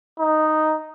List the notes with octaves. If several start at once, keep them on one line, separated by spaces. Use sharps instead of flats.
D#4